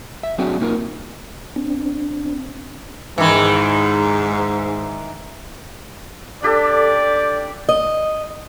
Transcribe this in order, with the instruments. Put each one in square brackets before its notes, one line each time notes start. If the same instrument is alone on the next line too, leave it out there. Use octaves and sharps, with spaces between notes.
[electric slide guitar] E5
F#3 C4 D4 F#4 G#4
A#3 D#4 F4 A#4
[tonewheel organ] C4 D4
[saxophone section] G#2 [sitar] D#3 E3
[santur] D4 G4 A4 [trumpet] D5
[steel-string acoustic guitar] D#5